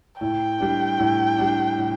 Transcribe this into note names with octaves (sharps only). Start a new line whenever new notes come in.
A2 G5
G3 D4
A2
G3 D4
A2